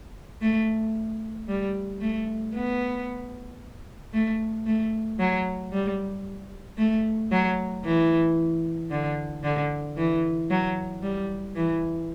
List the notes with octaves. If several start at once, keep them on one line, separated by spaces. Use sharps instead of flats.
A3
G3
A3
B3
A3
A3
F#3
G3
A3
F#3
E3
D3
D3
E3
F#3
G3
E3